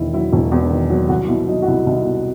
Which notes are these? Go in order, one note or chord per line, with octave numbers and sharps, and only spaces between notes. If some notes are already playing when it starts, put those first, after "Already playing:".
Already playing: E1 E2 D#3 E4
F#3 E4
E1
E2
D#3
F#3
C2 F#4
B2 E4
F#3 D#4
F#4
C2 E4
C2 D#4
B2